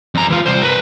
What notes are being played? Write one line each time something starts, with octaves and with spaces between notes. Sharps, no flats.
F2 A#5
E3 F4
C2 C5
A#4 B4